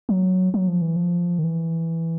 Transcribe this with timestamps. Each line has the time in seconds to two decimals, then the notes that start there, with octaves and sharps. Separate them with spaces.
0.09 F#3
0.54 F#3
0.68 F3
0.82 E3
0.96 F3
1.39 D#3
1.44 E3